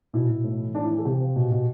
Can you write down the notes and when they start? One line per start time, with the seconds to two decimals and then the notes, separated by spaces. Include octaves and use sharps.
0.13 B2 E4
0.29 B2
0.44 A2
0.60 E3
0.75 A2 D4
0.85 E4
0.90 E3
0.98 A4
1.05 C3 G4
1.20 F3
1.36 B2
1.51 B2